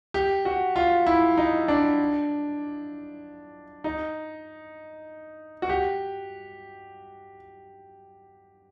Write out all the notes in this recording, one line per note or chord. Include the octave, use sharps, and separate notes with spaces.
G4
F#4
F4
E4
D#4
D4
D#4
F#4
G4